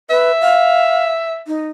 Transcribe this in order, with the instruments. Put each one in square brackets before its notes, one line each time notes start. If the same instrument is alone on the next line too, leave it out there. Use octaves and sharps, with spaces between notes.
[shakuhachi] B4 [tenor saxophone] E5
[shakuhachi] F5
D#4